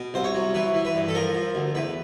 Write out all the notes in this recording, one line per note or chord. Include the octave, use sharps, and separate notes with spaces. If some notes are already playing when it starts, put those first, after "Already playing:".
Already playing: B2
C2 C5
C#5
F#3
E3 B4
E3
B4
G2
A4
F3 A#4
F3
D2
E2 B4